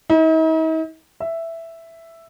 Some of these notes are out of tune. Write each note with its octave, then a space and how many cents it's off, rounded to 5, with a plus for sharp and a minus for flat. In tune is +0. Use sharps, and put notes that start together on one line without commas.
D#4 +45
E5 +5